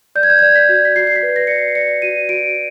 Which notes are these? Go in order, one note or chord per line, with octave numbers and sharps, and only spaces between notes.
D5 G6
G#6
G6
G#6
D5 G6
B6
F#4
B6
F#4 C7
C7
B6
B4
A#6
D5 C#7
C7
D5 C#7
F#4 D#7
F#4 D7